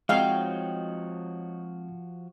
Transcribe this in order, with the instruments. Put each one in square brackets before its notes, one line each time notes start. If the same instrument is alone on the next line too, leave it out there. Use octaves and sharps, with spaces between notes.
[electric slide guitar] F3 F#4 [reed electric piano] G#3 C4 [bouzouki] D#4 C#5 G5 [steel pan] F5